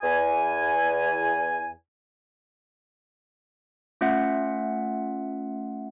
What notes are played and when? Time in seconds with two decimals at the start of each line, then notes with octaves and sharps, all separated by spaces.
0.02 E2 G#5
4.01 A3 C#4 F4 E5 F#5